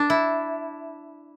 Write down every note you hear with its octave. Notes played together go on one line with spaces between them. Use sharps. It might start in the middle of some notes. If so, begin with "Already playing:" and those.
Already playing: D4
E4